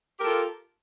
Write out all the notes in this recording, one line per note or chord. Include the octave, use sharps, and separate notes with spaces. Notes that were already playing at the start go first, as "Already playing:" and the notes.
F4 G4 A4 A#4